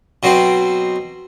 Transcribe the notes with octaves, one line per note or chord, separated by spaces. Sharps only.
B2 F#3 C4